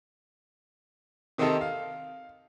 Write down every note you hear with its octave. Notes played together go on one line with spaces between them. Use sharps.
C3 D#3 C4 D#4 G4 A4
F5